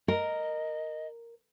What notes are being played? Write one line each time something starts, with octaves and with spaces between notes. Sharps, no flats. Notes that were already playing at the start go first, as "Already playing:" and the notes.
A#4 D#5